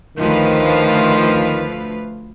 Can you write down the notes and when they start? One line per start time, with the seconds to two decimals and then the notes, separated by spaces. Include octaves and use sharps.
0.18 D2 D#3 F3 A3 B4 F5